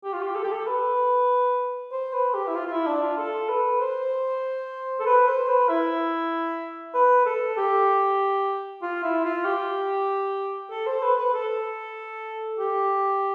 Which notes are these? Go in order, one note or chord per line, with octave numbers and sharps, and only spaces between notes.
G4
F4
G4
A4
G4
A4
B4
C5
B4
G4
E4
F4
F4
E4
D4
F4
A4
B4
C5
A4
B4
C5
B4
E4
B4
A4
G4
F4
E4
F4
G4
A4
C5
B4
B4
A4
G4